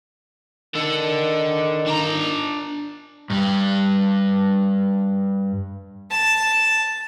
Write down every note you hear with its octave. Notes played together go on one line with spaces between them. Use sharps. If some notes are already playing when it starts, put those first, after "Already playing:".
D3 D#3 A4
D4 A#5
G2 G3
A5